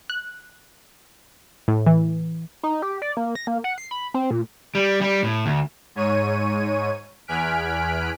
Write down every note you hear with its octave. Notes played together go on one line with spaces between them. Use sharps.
F#6
A2
E3
D#4
G4
D5
A#3
A#6
A#3
F#5
C7
B5
C4
A#2
G3
G3
A2
D2
G#2 C#5 D#7
E2 G#5 F6 F#6 B6 D7